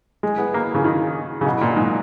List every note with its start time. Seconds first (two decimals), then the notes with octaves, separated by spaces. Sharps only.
0.23 G#3
0.38 B3
0.54 A#3
0.74 C#3
0.84 D#3
1.41 C#3
1.46 B2
1.61 A#2
1.76 G#2